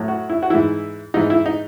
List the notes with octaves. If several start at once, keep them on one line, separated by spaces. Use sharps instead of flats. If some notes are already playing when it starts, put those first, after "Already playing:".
Already playing: A2 F#3
F#4
E4
F#4
G#2 E3 E4
G#2 E3 D#4
E4
D#4